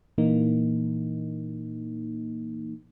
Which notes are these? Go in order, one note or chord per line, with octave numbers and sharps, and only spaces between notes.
A#2 E3 A#3 D#4